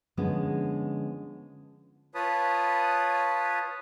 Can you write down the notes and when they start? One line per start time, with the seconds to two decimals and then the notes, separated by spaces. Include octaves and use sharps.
0.17 D3 F3 G#3 B3 C#4
2.15 F4 B4 C#5 A5 B5 D#6